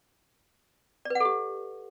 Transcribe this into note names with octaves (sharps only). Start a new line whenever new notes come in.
G4 A4 B4 D5 F#5